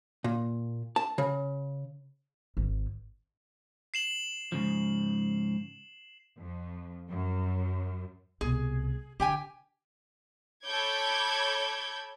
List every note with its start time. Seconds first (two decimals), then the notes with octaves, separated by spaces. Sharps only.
0.24 A#2
0.96 A5
1.18 C#3
2.57 G#1
3.94 C7 E7 F#7
4.52 G#2 C#3 F3
6.37 F2
7.08 F#2
8.41 C2 B2 G#4
9.20 D3 G4 G5 G#5
10.64 A4 C#5 B5 D6 G6 G#6